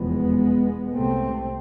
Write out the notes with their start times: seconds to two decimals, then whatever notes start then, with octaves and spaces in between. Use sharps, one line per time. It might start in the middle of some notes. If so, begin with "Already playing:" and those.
Already playing: F1 E2 B2 G#3 B3
0.94 C2 C3 A3 C4